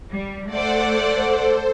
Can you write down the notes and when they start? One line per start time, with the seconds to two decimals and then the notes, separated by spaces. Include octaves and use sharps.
0.12 G3
0.50 A3 A4 C5 D5 F#5